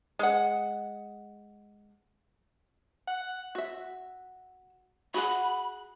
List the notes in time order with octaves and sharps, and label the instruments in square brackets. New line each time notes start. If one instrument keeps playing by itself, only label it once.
[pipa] G#3 F#5
[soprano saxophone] F#5
[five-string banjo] F#4 E5
[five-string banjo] F#4 G#4 F#5 [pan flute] B5